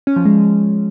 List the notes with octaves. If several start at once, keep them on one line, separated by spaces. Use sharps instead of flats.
C#4
F3
G#3